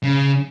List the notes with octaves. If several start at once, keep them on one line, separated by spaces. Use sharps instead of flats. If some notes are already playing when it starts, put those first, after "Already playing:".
C#3